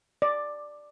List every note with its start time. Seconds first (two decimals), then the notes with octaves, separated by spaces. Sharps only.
0.22 D5